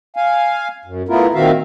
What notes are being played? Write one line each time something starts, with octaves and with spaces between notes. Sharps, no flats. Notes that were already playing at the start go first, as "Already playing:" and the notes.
F5 G#5
F#2
A3 B3 E4 F4 A#4
A#2 D#3 C4 F#4 E5 F5